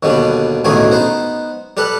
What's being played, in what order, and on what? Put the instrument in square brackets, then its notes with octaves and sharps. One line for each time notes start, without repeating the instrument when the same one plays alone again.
[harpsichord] D#2 B2 D3 G3
A1 D2 B2 D#3 A3 G#4
B3 D#4 C5
G3 A4 B4